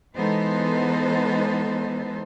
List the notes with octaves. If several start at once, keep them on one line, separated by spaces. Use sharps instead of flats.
E3 G#3 B3 D#4 A4 C5